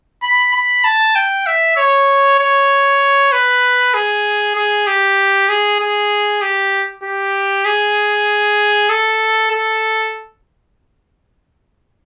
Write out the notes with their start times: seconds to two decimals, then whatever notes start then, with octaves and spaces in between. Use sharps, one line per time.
0.22 B5
0.54 B5
0.84 A5
1.16 G5
1.46 E5
1.77 C#5
2.39 C#5
3.32 B4
3.94 G#4
4.55 G#4
4.87 G4
5.49 G#4
5.80 G#4
6.42 G4
7.03 G4
7.65 G#4
8.89 A4
9.51 A4